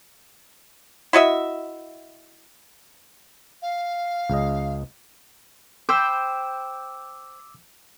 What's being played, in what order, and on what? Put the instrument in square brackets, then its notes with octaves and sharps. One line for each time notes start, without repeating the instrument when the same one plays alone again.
[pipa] E4 F#4 D#5 E5
[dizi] F5
[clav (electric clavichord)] C#2 C#3 D#5
[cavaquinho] C5 G5 B5 [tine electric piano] D6 E6